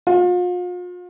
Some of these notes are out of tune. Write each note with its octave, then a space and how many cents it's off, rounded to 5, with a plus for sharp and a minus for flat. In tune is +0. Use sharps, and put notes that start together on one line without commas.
F4 +40